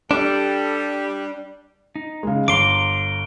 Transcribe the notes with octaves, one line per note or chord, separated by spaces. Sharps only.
G3 D4 A4
D#4
C#3 G#3
G1 A#5 C6 D6 D7 G7